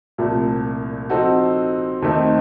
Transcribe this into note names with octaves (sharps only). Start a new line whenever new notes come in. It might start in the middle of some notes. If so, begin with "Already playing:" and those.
C2 A#2 F3 A3
F3 C4 D#4 F#4 A4
D#2 D#3 A3 C4 D#4